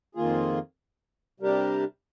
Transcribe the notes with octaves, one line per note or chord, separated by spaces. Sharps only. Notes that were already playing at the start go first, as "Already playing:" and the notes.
F2 D#3 A#3 F4 G#4
C3 G3 D4 G4 A#4